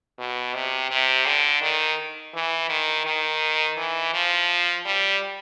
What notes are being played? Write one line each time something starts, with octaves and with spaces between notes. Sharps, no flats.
B2
C3
C3
D3
D#3
E3
D#3
D#3
E3
F3
G3